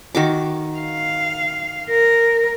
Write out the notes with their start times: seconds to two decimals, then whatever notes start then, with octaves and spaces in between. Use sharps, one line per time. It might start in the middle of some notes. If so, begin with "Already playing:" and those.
0.15 D#3 F#4 D6
0.79 F5
1.90 A#4